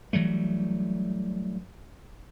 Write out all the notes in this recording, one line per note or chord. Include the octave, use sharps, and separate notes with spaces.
E3 F#3 G3 A3